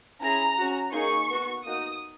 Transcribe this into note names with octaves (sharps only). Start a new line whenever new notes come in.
C#4 E4 G#4 A#5
C#4 F#4
A#3 D#4 G#4 C#6
B3 F#4
A#3 D#4 F#4 D#6